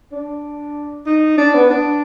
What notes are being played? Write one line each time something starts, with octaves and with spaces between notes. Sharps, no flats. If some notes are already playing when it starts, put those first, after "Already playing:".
D4
D#4
D4
B3
D4